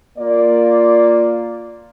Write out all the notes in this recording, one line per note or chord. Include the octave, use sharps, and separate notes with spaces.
A#3 F4 D5